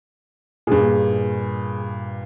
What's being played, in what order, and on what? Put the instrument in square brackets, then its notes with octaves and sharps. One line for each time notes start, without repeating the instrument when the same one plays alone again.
[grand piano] G2 A#2 [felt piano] G#4